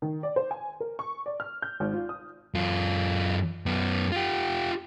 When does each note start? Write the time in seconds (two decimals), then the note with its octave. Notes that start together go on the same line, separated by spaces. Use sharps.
0.02 D#3
0.23 D5
0.36 C5
0.51 G#5
0.80 A#4
0.99 C#6
1.26 D5
1.40 F6
1.62 G6
1.80 G#1
1.94 F4
2.09 D#6
2.55 F#2 F4
3.66 F#2 B3
4.12 F4 G4